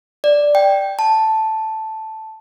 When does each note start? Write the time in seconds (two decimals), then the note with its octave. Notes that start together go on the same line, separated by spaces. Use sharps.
0.24 D5
0.55 G5
0.99 A5